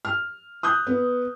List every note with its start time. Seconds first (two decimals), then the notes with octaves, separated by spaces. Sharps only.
0.05 F6
0.63 D#6 F#6 G6
0.87 B3